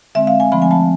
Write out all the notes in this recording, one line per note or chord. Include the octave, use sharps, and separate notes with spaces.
D3 G#3 C4 E5
F5
G#5
D3 F3 A3 C4 B5
G#5
A5